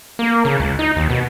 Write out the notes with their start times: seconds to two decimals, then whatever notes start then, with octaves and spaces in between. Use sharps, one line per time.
0.19 A#3
0.45 C#3
0.60 C#2
0.79 D#4
0.96 D#2
1.09 B2